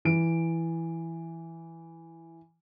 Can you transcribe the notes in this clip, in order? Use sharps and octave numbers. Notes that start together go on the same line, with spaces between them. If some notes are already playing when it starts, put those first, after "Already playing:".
E3 D7